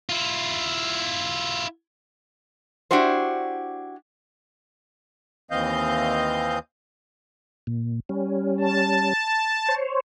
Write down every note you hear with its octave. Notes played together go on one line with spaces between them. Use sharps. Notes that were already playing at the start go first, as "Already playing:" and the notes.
E4 F4
D4 E4 F#4 G4 C5
D#2 E3 C4 D#5 F5 G6
A#2
G3 C#4
A5
C5 C#5